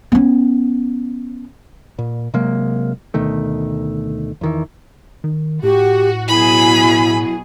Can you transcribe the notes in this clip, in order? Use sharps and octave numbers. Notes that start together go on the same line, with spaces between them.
B3 C#4
A#2
C3 F#3 G#3 A#3
D2 B2 D#3 A3
E2 D#3 E3
D#3
A2 F#4 G4
B2 F#3 E4 G#4 B5